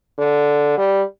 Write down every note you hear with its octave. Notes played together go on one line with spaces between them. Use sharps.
D3
G3